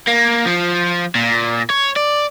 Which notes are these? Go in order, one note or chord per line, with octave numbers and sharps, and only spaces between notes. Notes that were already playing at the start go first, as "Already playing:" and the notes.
A#3
F3
A#2
C#5
D5